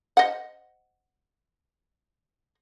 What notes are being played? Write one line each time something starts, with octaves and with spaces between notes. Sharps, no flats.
C5 D#5 F#5